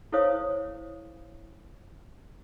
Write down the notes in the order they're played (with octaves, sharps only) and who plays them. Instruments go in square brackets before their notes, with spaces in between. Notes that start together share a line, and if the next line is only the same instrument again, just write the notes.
[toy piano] E4 A4 C5 C#5 F5 D#6